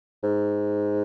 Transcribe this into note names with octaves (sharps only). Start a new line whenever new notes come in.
G#2